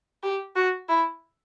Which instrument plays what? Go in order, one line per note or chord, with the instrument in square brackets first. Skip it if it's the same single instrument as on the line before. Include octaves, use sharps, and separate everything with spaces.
[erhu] G4
F#4
E4